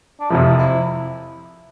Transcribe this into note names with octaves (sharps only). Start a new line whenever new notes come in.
D4
F2 C3 F3 E4
E4